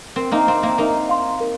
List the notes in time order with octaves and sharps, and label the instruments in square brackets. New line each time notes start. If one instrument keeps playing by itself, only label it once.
[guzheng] C4 [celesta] A#4
[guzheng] A#3 D#4
[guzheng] C4 [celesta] F5 C6
[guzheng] A#3
[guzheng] A#3 D#4 [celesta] A#4
[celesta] F5 C6
A#4